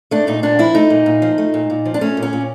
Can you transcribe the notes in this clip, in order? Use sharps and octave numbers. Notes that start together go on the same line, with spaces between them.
A3 D4
A#2 D#4
A#2 D4
F3 E4
A3 D#4
A#2
A#2
F3
A3
A#2
A#2
F3
D4
A3 C#4
A#2
C#4
A#2